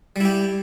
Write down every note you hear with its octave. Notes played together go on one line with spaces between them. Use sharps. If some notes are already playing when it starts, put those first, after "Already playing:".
G3 E4 G4